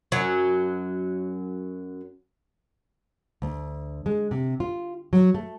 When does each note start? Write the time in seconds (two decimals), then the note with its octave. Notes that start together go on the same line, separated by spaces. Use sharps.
0.12 F#2 F#3
3.42 D2
4.06 G#3
4.31 C3
4.60 F4
5.13 F#3
5.35 A3